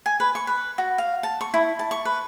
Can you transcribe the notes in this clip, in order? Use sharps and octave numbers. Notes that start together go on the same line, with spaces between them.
G#5
B4
C#6
B4
F#4
F5
A5
C#6
E4
A5
C#6
B4